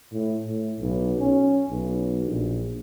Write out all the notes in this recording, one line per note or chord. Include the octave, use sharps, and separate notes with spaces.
A2
A2
B1
C#4
B1
A#1